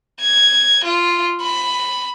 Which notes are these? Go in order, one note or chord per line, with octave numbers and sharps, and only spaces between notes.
G#6
F4
B5